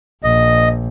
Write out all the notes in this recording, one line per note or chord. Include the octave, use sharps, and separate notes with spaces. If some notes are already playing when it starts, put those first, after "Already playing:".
A#1 D#5